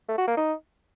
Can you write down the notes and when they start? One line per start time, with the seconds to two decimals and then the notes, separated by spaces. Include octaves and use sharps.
0.09 A3
0.18 F#4
0.28 A#3
0.37 D#4